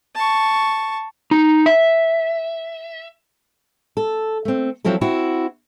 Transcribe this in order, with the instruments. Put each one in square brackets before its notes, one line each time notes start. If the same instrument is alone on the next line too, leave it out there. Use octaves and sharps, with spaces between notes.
[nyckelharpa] A5 C#6
[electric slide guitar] D#4
E5
[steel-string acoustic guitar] A4
A3 C4
F3 F#3 C4 E4 A4
C4 E4 F#4